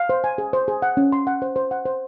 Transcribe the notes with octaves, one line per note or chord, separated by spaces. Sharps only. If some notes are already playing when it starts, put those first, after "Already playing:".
Already playing: F5
C5
G#5
G#4
C5
G#4
F#5
C#4
C6
F#5
C5
C5
F#5
C5